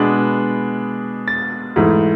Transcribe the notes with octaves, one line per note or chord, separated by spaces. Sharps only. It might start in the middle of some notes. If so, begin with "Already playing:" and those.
Already playing: B2 G#3 B3 D4
A6
G#2 E3 A3